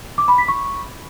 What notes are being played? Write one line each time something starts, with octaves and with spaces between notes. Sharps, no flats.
D6
B5
B6
C#6